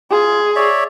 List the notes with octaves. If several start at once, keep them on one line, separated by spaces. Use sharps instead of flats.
F4 G#4
C#5 D5 E5